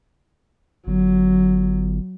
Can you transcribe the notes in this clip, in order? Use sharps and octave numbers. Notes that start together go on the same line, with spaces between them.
G1 F#3